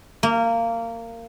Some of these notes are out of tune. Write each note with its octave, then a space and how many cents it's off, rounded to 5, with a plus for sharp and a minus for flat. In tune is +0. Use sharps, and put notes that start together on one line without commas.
A#3 -20